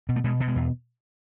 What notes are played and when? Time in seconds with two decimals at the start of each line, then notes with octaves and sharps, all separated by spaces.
0.09 B2
0.16 A3
0.24 B2 G#3
0.40 B2
0.48 G#3
0.56 E2